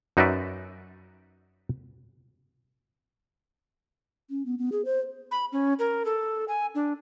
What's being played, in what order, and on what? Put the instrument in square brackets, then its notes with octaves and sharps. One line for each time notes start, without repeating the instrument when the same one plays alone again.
[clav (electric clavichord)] F#2 D#4 F#4 B4 D5 E5
[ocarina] C#4
B3
B3
G#4
C5
[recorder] B5
C#4
A#4
A4
G#5
D4